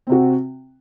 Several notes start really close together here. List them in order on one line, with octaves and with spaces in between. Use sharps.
C4 C3 F#4